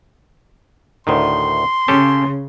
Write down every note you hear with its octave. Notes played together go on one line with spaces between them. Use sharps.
D2 A2 D#3 C6
C#3 C#4 G4 A4